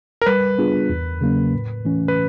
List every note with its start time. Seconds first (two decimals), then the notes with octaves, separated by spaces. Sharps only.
0.22 A#4
0.26 G3 B4
0.58 B3 D4 F4 G#4
0.89 E2
1.21 C#3 F#3 A#3 C#4
1.53 A2
1.85 E3 A3 C#4
2.08 B4